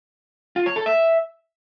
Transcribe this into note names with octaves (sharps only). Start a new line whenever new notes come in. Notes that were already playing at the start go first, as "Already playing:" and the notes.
F4
C#5
A4
E5